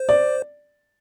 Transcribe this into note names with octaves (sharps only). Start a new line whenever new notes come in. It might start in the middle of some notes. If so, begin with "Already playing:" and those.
Already playing: C5
D5